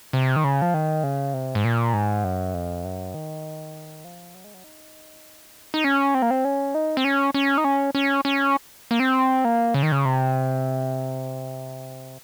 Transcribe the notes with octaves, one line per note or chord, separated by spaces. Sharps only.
C3
D#3
C#3
F3
D#3
C#3
C3
G#2
A#2
G#2
F#2
F2
F#2
D#3
F3
F#3
G#3
F#3
D#4
D#4
C#4
C4
A#3
C4
C#4
D#4
C4
C#4
C#4
D#4
C#4
C#4
C#4
A#3
C4
A#3
C#3
D#3
C#3
C3